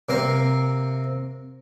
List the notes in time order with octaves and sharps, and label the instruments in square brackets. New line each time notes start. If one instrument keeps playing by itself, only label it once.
[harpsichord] C3 A#3 C4 A#4 C5